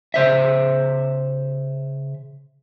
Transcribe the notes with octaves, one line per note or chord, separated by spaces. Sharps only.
C#3 C5 E5